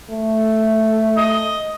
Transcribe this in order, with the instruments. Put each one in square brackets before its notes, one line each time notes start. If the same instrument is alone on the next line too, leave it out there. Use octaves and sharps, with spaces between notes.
[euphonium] A3
[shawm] D#5